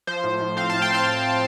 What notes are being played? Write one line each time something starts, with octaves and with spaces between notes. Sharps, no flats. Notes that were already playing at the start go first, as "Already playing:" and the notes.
F3 C5
A2
A2
C4 C5 F5
A2 F5 A5
G5 C6
C4 F5 A5